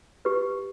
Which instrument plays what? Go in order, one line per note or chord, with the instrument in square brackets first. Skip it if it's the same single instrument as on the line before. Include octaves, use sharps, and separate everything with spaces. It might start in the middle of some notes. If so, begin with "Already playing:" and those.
[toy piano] G4 B4